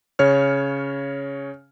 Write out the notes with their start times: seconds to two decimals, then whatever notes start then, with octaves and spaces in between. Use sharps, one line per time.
0.19 C#3 C#5 F6